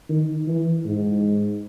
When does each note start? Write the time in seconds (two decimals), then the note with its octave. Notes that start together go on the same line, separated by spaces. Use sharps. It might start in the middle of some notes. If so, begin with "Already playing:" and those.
0.09 D#3
0.47 E3
0.85 G#2